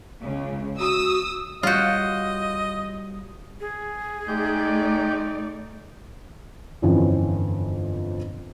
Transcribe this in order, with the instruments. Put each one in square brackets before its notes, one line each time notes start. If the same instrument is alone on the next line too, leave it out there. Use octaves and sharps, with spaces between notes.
[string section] C#2 C#3
[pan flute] F#4 [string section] D#6 E6
[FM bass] G3 [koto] F4 F#4 [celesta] C#5 F5 G6 [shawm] D#5
[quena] G#4
[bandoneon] G#3 G4 G6 [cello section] A3 D5 [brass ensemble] D#4
[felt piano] G1 F2 E3 F3 C4 C#4